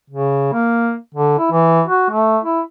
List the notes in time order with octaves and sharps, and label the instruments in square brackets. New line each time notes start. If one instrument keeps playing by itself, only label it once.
[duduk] C#3
A#3
D3
E4
E3
F#4
A3
E4